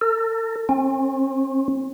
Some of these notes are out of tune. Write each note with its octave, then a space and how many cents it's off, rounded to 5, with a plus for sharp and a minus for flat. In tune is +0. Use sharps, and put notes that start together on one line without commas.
A4 +45
C4 +45